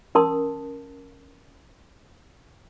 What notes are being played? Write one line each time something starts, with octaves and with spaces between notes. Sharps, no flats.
C#4 A#4 A5 C6 D#6